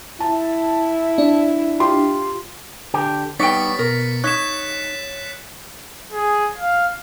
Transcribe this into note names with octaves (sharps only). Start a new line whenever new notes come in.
E4 A5
D4
F4 G4 C6
D3 G4 G5
G3 B3 D#4 C#5 G5 A6 B6 C#7
B2 A#4
D#4 C#5 F#6 B6 E7
G#4
F5